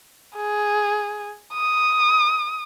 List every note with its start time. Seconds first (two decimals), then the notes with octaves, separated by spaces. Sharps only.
0.36 G#4
1.54 D#6